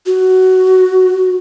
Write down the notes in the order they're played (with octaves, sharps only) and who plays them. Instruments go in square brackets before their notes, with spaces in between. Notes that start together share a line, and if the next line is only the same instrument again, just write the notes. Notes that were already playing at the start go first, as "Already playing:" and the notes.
[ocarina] F#4